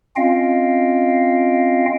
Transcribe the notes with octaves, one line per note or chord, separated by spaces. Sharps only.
C4 C#4 F4 D#5 F5 G5